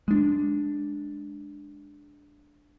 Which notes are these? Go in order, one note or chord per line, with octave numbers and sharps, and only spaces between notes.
G#3 D4